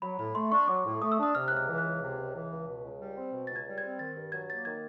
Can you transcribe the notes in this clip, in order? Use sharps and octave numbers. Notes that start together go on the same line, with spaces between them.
F#3 B5
A2 B5
A3 C6
D4 C#6
F#3 D6
A2
A3 D#6
E6
D4 D#6
C3 F6
C#2 F#6
F6
E3
F#6
C#2
C3
C#2
E3
C#2
B2
C#2
G3
C4
B2
C#2 A6
G#6
G3
C4 G#6
D#3 A6
G2
F#3 G#6
A#3 A6
D#3 G#6